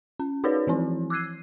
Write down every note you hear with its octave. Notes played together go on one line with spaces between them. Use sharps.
C#4
D#4 F#4 G#4 B4 C#5 D5
E3 F3 C4 E4
D6 E6 F#6 G#6 C7 D#7